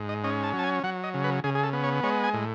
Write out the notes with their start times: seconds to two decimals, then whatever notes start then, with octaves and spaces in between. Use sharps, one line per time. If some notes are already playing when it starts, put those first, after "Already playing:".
Already playing: G#2
0.09 D#5
0.24 C#4 D#5
0.44 A5
0.53 F#3
0.59 A5
0.64 G#5
0.84 F#3 F#5
1.04 D#5
1.14 C#3
1.24 B4
1.44 C#3 G#4
1.55 G#4
1.63 A4
1.73 B3
1.84 C#5
2.03 G#3 C#5
2.24 G#5
2.34 A2